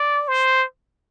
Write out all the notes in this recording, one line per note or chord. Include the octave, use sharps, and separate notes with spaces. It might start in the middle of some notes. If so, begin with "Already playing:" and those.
Already playing: D5
C5